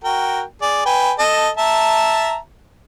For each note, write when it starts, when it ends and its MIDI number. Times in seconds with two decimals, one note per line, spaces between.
0.04 0.42 66
0.04 0.42 70
0.04 0.42 79
0.62 0.82 68
0.62 0.82 74
0.85 1.12 71
0.85 1.12 79
0.85 1.12 80
1.19 1.49 69
1.19 1.49 75
1.19 1.49 81
1.57 2.37 76
1.57 2.37 81
1.57 2.37 82